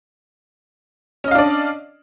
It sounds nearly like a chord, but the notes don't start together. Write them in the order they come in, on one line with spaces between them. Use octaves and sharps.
C#4 D#5 F5 D4 D5